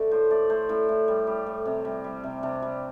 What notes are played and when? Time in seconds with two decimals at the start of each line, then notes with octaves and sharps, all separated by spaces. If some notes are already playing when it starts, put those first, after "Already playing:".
Already playing: D3 A3
0.11 A2 C5
0.31 A3 D5
0.50 A3 C5
0.69 A2 E4
0.89 A2
1.08 G3
1.27 G3
1.46 A2
1.66 C3
1.85 G3
2.04 G3
2.24 C3
2.43 C3 D4
2.62 G3